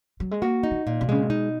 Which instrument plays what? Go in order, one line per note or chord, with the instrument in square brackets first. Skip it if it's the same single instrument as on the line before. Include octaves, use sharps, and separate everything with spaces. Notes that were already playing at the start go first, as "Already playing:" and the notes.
[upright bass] F#3
G#3
[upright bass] A#3 [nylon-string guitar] F#4
[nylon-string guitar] D#4
[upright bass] D#3
[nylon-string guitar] A#2
[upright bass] B2
[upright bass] C#3 [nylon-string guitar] G#3
[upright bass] B2
[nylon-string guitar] D#4